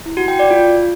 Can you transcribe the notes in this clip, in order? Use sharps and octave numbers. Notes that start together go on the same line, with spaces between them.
E4
F#4
G5
D5
F4